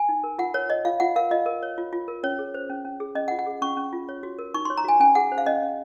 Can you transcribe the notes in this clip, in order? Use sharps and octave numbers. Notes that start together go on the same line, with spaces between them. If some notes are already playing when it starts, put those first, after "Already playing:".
Already playing: G#5
D#4
A#4
F4 F#5
A#4 C#5
C#5 D#5
F4 F5
F4 F#5
A#4 F5
F4 D#5
A#4
C#5
F4
F4
A#4
C#4 C#5
G#4
C5
C#4
C#4
G#4
C#4 D#5
F#5
F4
F#5
G#4
C#4 C#6
C#4
F4
C#5
F#4
A#4
D#4 C#6
C#5 C6
A#5
F#4 G#5
C#4 G#5
G#4 F#5
C5
F5
C#4 D#5
C#4